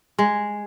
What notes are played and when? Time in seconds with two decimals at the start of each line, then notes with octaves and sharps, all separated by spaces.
0.19 G#3